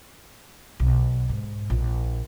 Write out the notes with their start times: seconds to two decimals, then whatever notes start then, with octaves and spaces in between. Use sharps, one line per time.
0.80 B1
1.29 G#2
1.70 A#1